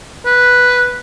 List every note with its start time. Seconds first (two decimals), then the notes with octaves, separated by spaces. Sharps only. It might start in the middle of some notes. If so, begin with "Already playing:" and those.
0.25 B4